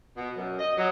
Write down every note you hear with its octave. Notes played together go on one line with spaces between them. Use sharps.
B2
F#2
D#5
F#3